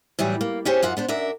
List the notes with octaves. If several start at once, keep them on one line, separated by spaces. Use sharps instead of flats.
A2 E3 F#3 G3
A#3
C#4 D4 G4 G#4 C5 C#5
F#2 F4 F#4 F#5
B3 D4 C5
F#2 D4 A#4 E5